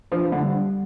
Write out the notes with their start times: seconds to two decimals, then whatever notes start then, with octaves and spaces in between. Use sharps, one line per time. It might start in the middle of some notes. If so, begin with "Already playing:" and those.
0.12 F3 D4
0.32 D3
0.43 G3